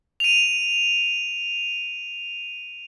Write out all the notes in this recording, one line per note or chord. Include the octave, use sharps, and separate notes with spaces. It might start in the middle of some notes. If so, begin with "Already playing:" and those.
D#7 F7